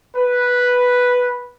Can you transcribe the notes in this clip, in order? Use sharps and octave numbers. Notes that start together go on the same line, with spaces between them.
B4